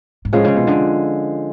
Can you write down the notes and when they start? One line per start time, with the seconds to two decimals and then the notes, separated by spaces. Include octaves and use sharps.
0.25 G#2
0.33 A2 F3 G#3 C#4 F4
0.44 C#3
0.56 B2
0.67 D3